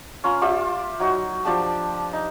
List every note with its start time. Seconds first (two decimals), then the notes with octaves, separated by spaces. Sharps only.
0.24 C#4 F4 A#5
0.41 F4 G4 D5 E5
1.00 F#3 D#4 F#4
1.45 F3 D4 G4 A5
2.13 D#4